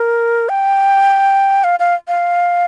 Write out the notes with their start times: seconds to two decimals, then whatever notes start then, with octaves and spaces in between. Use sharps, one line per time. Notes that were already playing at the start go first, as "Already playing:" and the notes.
Already playing: A#4
0.49 G5
1.64 F5
1.79 F5
2.08 F5